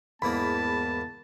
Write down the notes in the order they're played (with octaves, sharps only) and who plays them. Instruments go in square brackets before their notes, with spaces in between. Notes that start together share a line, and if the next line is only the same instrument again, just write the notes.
[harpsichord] E2 G#2 A#3 [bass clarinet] B3 [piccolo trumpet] A5 [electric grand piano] B5